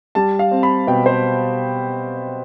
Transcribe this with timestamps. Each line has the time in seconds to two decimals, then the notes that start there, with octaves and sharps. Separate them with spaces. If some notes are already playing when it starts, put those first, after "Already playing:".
0.15 G3 A5
0.39 F5
0.51 C4
0.63 B5
0.87 B2 G5
1.06 C5